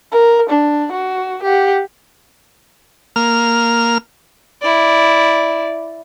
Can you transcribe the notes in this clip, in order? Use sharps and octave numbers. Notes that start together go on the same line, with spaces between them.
A#4
D4
F#4
G4 F#5
A#3 F6
E4 D5